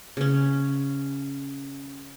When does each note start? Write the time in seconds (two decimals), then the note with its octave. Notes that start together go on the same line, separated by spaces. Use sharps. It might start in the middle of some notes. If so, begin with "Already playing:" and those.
0.17 C#3 C#4